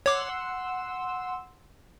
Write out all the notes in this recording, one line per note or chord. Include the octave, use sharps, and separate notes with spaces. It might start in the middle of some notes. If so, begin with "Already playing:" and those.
C#5 F#5 C6 D6 E6